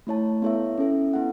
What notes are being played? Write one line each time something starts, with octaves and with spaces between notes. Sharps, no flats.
A3 E4 C#5 A5
B3 E4 A4 C#5 E5
C#4 E4 A4 E5
B3 E4 A4 F#5